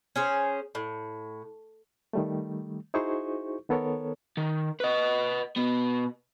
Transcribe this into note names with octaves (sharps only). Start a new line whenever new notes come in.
C#4 G#4 C5
A2
D#3 G3 A3
D#4 E4 F#4 G#4 C5 C#6
D#3 B3 A4 A#4 C#5
D#3
B4 D#5
B2 B3